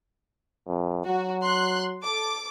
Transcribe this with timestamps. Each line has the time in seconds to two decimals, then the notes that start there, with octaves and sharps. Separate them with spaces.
0.67 F2
1.06 F#3 F#4
1.43 C6 F#6
2.03 A4 D6